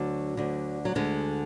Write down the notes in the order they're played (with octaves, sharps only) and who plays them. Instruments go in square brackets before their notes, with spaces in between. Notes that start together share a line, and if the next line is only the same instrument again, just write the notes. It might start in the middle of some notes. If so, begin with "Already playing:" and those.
Already playing: [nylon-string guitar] D2 D3 F#3
D2 D3
F#3
D2 D3 G#3